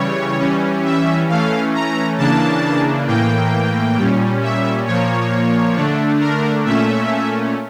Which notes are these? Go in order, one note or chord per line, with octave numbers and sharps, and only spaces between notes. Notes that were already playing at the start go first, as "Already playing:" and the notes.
Already playing: C#3 E3 G3 C#5
E3 G3 C#4
E5
E3 A3 C#4 F5
A#5
C#3 E3 A#3 D4 A5
A2 E3 A#3 G5
A#2 G3 C#4
E5
A#2 F3 A#3 C#5
D3 A3 D4
A#4
A#2 A3 C#4 E5